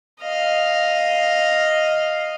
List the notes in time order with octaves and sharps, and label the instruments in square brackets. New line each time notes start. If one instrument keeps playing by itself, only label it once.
[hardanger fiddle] D#5 F5